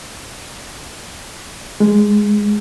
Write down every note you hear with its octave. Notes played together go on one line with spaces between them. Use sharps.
G#3